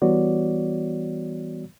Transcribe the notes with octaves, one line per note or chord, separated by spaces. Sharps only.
E3 G3 B3 F#4 C#5 D5